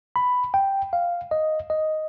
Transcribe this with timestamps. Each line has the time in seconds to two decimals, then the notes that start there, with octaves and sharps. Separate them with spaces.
0.16 B5
0.54 G5
0.93 F5
1.31 D#5
1.70 D#5